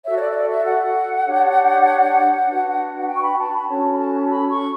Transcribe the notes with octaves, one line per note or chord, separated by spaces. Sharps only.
F#4 A4 C#5 E5
C#5
D5
E5
D5
E5
F#5
D4 G4 C#5
D4 F#4 B4
F#5
G5
C#6
B5
G5
A5
B5
C#4 F#4 A4 C#5 A5
B5
A5
B5
C#6